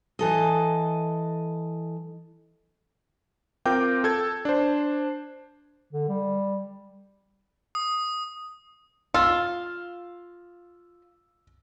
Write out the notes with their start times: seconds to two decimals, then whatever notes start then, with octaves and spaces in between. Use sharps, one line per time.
0.19 E3 A4 D#5
3.66 C4 F4 A#4 G5 D6 G6
4.04 A4 G#6
4.45 D4 C5
5.93 D3
6.09 G3
7.75 D#6
9.14 F4 E6